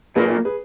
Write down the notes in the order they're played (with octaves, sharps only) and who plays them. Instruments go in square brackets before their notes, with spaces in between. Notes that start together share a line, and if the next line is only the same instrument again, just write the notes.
[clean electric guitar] B1 A#2 A#3 [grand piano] G#4 B4
[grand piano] G#4 B4